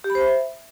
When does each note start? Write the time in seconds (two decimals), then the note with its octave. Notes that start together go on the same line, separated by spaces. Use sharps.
0.04 G4
0.10 B5
0.15 C5
0.20 E5